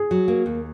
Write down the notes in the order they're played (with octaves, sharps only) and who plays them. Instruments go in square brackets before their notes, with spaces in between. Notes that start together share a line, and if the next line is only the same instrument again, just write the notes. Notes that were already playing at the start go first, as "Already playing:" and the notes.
Already playing: [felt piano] G#4
[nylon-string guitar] F#3
A#3
D#2